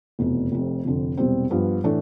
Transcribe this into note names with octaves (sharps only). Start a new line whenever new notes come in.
F1 E2 B2
F1 F2 C3
F1 F2 D3
E1 E2 C3 G3 C4
G2 F3 B3
A2 E3 A3 D4